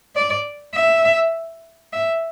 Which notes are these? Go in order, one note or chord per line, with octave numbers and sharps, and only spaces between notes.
D5
E5
E5